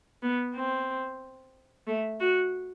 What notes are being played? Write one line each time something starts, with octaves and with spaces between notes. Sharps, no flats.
B3
C4
A3
F#4